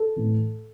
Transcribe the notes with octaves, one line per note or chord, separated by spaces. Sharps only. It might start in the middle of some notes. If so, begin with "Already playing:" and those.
Already playing: A4
A2 E3